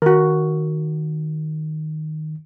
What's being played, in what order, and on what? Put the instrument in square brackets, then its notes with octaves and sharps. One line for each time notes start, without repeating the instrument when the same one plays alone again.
[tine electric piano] D#3 [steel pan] F#4 A#4